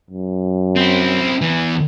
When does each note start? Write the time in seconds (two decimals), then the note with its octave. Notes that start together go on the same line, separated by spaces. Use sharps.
0.11 F#2
0.76 C4 E4
1.42 E2 E3